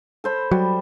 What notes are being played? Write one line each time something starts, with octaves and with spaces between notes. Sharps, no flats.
A4 C5 B5
F#3 G3